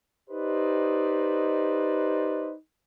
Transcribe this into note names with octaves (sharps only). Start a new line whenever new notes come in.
D#4 G4 B4 C5 D5 D#5